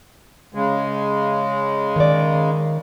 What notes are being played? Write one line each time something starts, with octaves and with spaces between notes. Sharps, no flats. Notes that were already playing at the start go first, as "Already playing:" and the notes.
C#3 G#3
D#3 D5